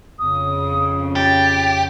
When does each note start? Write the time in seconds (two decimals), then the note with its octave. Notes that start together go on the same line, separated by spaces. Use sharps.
0.19 F2 C#3 D#6
1.16 G4 A6